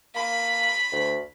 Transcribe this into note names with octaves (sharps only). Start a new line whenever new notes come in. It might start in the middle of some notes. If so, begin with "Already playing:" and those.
A#3 B5
D2